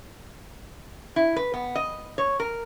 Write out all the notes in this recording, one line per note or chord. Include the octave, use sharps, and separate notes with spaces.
E4
B4
B3
D#5
C#5
A#4